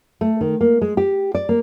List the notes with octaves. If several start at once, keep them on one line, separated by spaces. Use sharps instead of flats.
A3
D#3
A#3
G#3
G4
D5
A#3